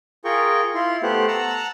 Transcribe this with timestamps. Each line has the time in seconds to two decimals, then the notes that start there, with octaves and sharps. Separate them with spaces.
0.25 F4 G#4 A#4 G5 C#6
0.75 E4 F4 C6
1.03 A3 B3 G4 C5 F#5
1.28 F#5 A5 A#5 E6